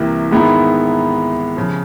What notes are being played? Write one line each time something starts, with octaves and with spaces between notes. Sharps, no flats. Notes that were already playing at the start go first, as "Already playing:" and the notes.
Already playing: C2 C3 E3 G3 A#3
G#2 D#3 G#3 B3 E4
C#3 F3